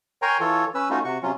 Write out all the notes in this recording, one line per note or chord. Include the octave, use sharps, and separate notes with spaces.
A#4 C#5 G5 G#5 A#5 C6
E3 F4 A4 C#5
C#4 B4 E6
A3 C#4 D#4 F4 F#4
C3 F#4 C#6
C3 F#3 C#4 F4